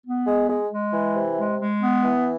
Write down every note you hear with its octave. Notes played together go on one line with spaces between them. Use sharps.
B3
G#3
G#3
G#3
E3
C3
G#3
G#3
B3
E3